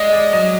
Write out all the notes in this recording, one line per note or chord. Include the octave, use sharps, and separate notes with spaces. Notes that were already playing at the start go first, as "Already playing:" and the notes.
Already playing: G#3 D5 D#5
D5
F#3 D#5